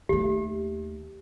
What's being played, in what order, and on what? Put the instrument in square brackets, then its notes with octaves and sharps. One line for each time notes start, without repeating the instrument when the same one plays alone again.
[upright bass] D#2 A3 [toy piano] G4